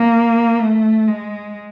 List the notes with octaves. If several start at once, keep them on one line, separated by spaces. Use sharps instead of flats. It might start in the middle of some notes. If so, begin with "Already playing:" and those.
Already playing: A#3
A3
G#3